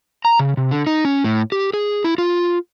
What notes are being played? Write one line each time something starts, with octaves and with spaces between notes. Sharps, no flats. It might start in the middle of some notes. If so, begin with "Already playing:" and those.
A#5
C#3
C3
D3
D#4
C#4
A2
G4
G#4
E4
F4